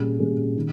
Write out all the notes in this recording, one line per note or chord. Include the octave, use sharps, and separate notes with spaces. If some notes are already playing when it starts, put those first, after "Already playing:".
Already playing: A#2 G3 C#4 G#4
A#2 G3 C#4 G#4
D#3